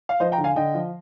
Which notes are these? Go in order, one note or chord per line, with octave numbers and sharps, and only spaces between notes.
F5
F3 C5 D#5
G5 A#5
D3
F5 G#5
D3 D#5 G5
F3